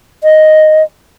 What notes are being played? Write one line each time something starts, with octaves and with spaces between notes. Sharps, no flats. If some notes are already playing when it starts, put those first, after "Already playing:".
D#5